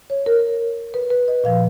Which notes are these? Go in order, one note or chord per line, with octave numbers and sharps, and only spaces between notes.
C#5
A#4
B4
B4
D#5
A#2 F3 F5